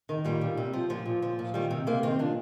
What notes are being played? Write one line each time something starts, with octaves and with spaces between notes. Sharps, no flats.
D#3
A#2 G3
A#2
C3
F3
A#2 F3
A#2
F3
A#2
D#3 G3
C3
C3 A#3
D#3 C4
A#2 D4